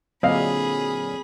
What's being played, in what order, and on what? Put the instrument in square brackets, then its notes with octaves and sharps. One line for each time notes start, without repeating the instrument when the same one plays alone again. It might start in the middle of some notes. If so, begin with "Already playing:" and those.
[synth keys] A#2 D3 F#3 [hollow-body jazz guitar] C4 [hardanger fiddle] G#4 B5 [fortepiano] D#5 F5